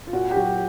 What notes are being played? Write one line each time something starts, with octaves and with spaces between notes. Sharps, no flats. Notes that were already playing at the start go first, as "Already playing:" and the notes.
F4
A#2 F#4
G4
F#3 F#4